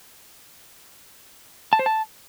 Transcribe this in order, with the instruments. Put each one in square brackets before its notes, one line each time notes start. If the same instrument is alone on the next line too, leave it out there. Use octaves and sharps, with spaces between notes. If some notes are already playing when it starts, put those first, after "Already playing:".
[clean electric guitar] A5
C5
A5